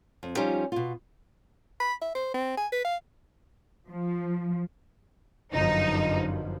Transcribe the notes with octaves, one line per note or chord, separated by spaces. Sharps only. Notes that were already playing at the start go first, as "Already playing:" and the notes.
F2
F3 G3 C#4 D#4 F4 G4
B2 F4
B5
E5
C5
C4
G#5
B4
F5
F3
G1 F#2 F3 D#4